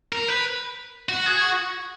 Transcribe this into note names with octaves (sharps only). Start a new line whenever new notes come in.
A#4
B4
F#4
G#4
F#4